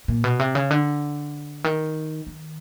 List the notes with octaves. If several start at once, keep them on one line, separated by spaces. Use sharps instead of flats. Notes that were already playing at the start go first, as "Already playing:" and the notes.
A#2
B2
C3
C#3
D3
D#3
D#3